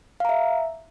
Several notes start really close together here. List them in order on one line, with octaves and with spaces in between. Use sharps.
F5 A#5 E5